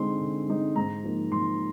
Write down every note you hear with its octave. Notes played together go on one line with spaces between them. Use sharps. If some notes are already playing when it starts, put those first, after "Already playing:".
Already playing: D3 G#3 C4 D#4 C6
D3
G#3 C4 D#4
G#2 A#5
F3 A#3 D#4
G#2 C6